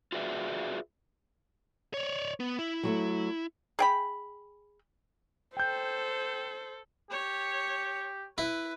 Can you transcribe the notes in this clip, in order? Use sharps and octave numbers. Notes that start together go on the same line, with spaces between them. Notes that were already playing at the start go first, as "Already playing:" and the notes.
F4 F#4 G#4 B4 D5 E5
C#5 D5
B3
E4
F#3 G#3 A3
G#4 G5 B5
A4 C5 G5 G6
G4 C#5
E4 B4